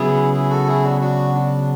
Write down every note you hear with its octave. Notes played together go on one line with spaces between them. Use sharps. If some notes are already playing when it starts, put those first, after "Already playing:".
Already playing: C#3 F#3 B3 E4 G#4
E4 G#4
F#4 A4
E4 G#4
D4 F#4
D4 F#4
D4